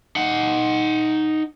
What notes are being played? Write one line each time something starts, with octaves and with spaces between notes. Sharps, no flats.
D#4 F#5